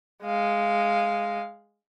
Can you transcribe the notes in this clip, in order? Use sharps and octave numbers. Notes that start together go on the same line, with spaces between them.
G#3 F5